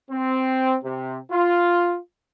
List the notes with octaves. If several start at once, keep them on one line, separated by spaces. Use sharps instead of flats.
C4
C3
F4